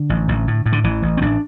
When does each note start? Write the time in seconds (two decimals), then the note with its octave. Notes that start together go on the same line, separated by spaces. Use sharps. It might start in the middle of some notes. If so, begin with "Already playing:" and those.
Already playing: D3
0.09 A1
0.28 A1
0.47 A2
0.66 A2
0.73 D3
0.84 A1 E3
1.02 A1
1.18 C4
1.21 A1 D4